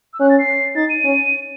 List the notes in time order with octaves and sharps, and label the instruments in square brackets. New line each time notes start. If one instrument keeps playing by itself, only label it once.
[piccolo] E6
[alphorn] C#4 [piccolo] F#6
[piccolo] A6
C7
[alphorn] D#4 [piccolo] A6
[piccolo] D#7
[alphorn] C#4